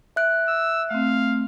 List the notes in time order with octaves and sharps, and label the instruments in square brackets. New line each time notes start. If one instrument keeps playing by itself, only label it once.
[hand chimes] E5 F#6 D7
[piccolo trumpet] E6
[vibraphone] A3 C4 [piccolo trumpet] F5